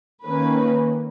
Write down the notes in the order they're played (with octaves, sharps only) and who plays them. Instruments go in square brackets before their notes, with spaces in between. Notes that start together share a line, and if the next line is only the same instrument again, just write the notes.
[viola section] D#3 A#3 C#4 B4